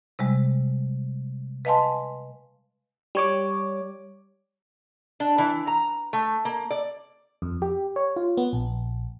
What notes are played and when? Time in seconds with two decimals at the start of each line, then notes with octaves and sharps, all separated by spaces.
0.19 C3 G3 G#3
1.65 B4 D#5 F5 G#5 A5 C6
3.15 G3 C#5 D6
5.20 D4
5.38 E3
5.67 A#5
6.13 A3
6.45 A#3
6.70 D5
7.42 F2
7.62 G4
7.96 C#5
8.16 F4
8.37 B3
8.53 A#1